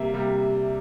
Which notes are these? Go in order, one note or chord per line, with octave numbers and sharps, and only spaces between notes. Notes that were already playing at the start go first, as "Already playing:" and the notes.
Already playing: C3 G3 A#3 E5
C3 G3 A#3